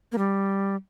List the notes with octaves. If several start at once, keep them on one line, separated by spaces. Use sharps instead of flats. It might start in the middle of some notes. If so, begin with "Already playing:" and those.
A#3
G3